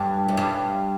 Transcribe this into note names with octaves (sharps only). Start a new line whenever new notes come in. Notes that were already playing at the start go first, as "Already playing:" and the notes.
Already playing: G2
F#2
G2